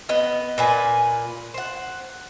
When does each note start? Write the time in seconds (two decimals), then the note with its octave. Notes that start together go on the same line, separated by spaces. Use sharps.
0.09 B3 D#5
0.58 A#2 B4 G#5
1.54 C5 F#5